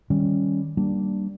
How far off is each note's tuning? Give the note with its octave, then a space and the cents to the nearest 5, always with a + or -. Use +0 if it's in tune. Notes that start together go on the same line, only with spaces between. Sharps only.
D#3 +0 G3 +0 C#4 +0
G3 -10 A#3 +0 D4 +0